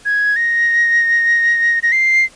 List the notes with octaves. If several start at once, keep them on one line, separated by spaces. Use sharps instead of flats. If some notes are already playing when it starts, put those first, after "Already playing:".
G#6
A#6
A#6
C7